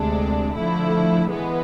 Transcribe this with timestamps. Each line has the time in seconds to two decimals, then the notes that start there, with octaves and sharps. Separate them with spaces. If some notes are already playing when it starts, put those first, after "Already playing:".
Already playing: D2 C3 G#3 D4
0.56 D3 F3 A3 E4
1.28 E3 G#3 B3